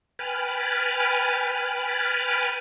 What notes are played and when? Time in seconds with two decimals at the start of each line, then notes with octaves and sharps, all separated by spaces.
0.19 B4 G5 G#5 B5 F6 A6